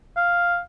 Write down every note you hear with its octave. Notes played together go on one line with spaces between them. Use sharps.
F5